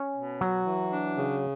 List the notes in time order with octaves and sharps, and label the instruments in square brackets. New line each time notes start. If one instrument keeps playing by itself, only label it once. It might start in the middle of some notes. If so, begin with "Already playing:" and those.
Already playing: [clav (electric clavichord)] C#4
[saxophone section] B2
[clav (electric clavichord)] F#3 [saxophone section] F#4
[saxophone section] E3
D4
C#3